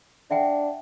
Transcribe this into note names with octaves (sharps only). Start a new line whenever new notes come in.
D4 E5 F#5 G5